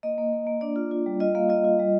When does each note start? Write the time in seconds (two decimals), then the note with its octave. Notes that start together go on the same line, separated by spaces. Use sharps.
0.03 A#3 D#5
0.18 A#3
0.33 A#3
0.47 A#3
0.61 D4 D5
0.76 F4
0.91 F4
1.06 G3
1.20 F4 D#5
1.35 A#3 F5
1.49 F4 D#5
1.64 F4
1.79 G3